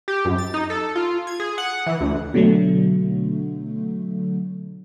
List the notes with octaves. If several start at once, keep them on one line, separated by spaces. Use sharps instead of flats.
G4
F#2
A6
D#4
A4
F4
G#6
G#4
F#5
E3
D2
B2 D3 F#3 A3